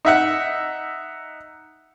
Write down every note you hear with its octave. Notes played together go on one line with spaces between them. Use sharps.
D#4 E5 F#5